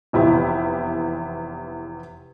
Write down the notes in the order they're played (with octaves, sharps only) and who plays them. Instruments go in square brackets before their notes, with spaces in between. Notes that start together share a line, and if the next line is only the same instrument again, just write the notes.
[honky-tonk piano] F1 E2 E4 G4